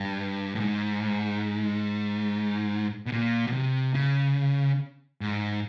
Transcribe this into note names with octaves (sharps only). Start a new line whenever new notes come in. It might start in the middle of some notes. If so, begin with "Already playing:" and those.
Already playing: G2
A2
G#2
B2
A#2
B2
C3
C#3
G#2